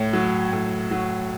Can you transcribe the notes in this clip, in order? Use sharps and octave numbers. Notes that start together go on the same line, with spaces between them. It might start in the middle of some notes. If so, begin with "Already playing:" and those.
Already playing: A2 C#5
F#3
A2
F#3